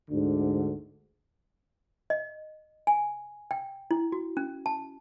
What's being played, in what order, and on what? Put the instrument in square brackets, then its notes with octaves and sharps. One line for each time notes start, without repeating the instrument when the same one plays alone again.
[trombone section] D2 G#2 D3
[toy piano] D#5
G#5
G5
E4
F#4
C#4
A5